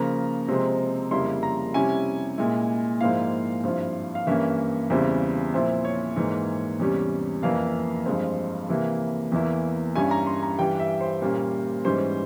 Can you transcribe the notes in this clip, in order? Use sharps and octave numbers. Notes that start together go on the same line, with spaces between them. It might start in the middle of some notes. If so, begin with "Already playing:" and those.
Already playing: C#3 F3 A#3 A#5
C3 F3 G#3 C4
F2 C#3 G3 A#3 E4 C6
A#5
C3 G3 C#4 E4 G#5
A#2 G#3 E4
G#2 F3 A#3 E4 F5
G2 F3 C4 E4
F5
G2 E3 A#3 C#4 E4 E5
E2 C#3 G3 C4 E4
A#2 F3 C4 E4 E5
C#5
G#2 E3 A#3
E2 C3 G3 C#4
F2 E3 A#3 F5
G2 F3 G#3 C4
C3 E3 A#3 E4
E2 E3 A#3 E4
G2 G3 C#4 E4 G#5
A#5
C6
A#5
G2 E3 G3 G5
E5
C5
A#2 G3 A#3 C#4
G#2 E3 G3 C#4 C5